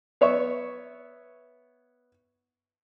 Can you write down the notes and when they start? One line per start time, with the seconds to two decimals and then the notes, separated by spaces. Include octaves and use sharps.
0.21 B3 C#5 E5 C#6